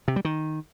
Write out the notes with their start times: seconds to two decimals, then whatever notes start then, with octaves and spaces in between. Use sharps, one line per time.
0.08 C3
0.16 G3
0.25 D#3